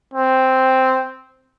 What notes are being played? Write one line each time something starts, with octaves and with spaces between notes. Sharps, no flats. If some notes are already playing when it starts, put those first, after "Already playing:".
C4